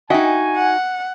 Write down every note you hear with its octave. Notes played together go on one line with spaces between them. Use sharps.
D#4 F#4 D#5 E5 G5 G#5
F#5